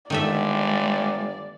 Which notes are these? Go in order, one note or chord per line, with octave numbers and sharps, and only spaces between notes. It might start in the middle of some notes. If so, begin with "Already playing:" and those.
G1 D#3 G#3 A3 D5 E5